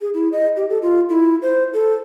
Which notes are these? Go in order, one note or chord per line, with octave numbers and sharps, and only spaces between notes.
G#4
E4
D#5
G4
A4
F4
E4
C5
A4